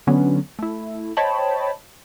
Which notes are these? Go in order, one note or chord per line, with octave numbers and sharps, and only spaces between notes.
D3 F#3 B3 C#4
A3 E4
C5 C#5 D#5 G5 A5 B5